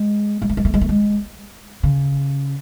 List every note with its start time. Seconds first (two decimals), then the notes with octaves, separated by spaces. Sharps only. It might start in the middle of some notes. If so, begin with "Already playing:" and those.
Already playing: G#3
0.42 G#3
0.49 A3
0.57 G#3
0.65 A3
0.74 G#3
0.81 A3
0.89 G#3
1.83 C#3